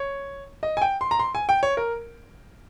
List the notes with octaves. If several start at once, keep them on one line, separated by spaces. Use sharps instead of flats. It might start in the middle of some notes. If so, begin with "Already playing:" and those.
Already playing: C#5
D#5
G#5
G5
C6
A#5
C6
G#5
G5
C#5
A#4